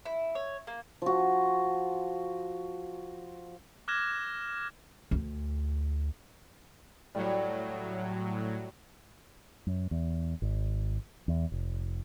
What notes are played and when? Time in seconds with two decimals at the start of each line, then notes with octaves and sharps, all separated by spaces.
0.06 E4
0.35 C#5
0.67 A#3
1.02 F3 F#4
3.88 D6 F6 F#6 G#6 A#6 E7
5.11 D2
7.15 A2 F#3 G3
9.67 F#2
9.91 E2
10.42 G#1
11.28 E2
11.52 F1